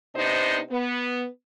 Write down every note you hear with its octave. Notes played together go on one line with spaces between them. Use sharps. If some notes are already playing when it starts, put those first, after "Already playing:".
C3 B3 D4 D#4 C5 D#5
B3